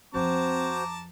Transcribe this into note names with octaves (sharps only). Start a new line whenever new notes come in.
F2 F3 C4 F#4 C5 A5 A#5 D6